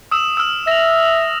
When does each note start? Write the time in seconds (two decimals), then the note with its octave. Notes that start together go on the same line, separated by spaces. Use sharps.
0.11 D#6 E6 E7
0.37 E6 F6
0.67 E5 A#6 F7